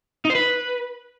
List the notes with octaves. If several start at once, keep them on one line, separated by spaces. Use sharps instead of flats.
D#4
C5
B4